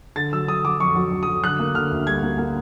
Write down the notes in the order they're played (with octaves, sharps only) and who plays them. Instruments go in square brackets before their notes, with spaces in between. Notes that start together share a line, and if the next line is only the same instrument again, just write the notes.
[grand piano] D3 A6
F#3 E6
F#3 D#6
F#3 D6
F2 C#6
F#3
F#3
F#3 D#6
D3 F#6
A#3
D3 F6
D2
G3 G#6
A#3
A#3